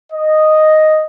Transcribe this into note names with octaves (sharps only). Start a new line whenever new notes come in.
D#5